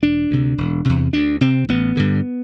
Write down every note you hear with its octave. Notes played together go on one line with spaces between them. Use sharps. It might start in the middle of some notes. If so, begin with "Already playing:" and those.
E1 D4
D2 C3
E1
E2 C3
D2 D4
C3 C4
A1 B3
G2 D3